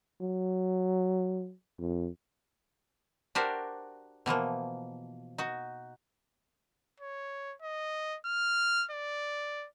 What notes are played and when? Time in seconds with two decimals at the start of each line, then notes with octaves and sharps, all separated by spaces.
0.21 F#3
1.79 F2
3.35 D4 F#4 G4 A#4 C5
4.26 B2 E3 F3 A#3
5.38 D#4 F#4
7.00 C#5
7.62 D#5
8.26 F6
8.91 D5